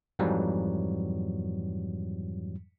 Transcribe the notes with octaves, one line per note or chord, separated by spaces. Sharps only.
F2 G#2 E3 F#3 G3